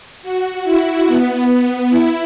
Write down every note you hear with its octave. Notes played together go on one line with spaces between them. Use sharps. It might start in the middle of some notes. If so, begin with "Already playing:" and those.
F#4
E4
B3
B3
E4